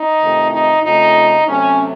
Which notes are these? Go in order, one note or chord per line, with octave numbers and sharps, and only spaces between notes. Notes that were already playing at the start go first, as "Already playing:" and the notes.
Already playing: D#4
F2 C3 D#3 A3
D#4
F2 C#3 F3 A3 D#4
C3 F#3 A3 C#4